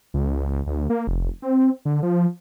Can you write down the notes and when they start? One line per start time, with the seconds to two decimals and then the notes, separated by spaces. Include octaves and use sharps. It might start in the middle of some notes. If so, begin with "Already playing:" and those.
0.14 C#2
0.66 D2
0.90 A#3
1.07 F1
1.42 C4
1.85 D3
2.03 F3